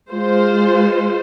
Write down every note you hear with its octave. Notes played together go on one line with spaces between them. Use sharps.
G#3 F4 C5